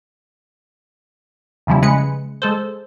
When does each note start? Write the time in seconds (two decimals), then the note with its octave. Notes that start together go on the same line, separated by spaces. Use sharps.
1.67 E2 C#3 F3 G3 E4
1.82 C#3 G#3 B4 C#7
2.42 G#3 A4 C5